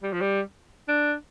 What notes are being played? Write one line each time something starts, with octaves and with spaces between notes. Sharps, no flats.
G3
F3
G3
D4